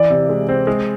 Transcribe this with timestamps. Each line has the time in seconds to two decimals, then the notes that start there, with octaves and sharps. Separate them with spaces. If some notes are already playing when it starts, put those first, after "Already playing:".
Already playing: E3 D5
0.10 C3
0.29 G#3
0.49 C4
0.67 G#3